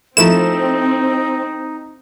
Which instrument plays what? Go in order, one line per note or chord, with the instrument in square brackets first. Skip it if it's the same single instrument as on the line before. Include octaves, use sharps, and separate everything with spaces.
[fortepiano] F3 A3 E4 [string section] C4 [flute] D#4 [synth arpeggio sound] E7